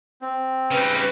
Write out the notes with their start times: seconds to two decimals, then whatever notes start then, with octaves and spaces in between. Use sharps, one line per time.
0.22 C4
0.71 C#3 G3 C#4 D#4 B4 F5